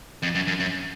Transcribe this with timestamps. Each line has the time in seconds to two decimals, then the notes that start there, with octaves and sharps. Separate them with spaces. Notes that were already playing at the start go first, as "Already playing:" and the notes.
0.23 F2
0.35 F#2
0.47 F#2
0.60 F#2